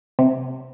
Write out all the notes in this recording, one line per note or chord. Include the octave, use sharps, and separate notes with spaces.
C3